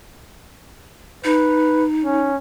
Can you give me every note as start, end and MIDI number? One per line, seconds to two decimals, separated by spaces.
1.25 2.28 63
1.25 1.84 71
2.04 2.36 61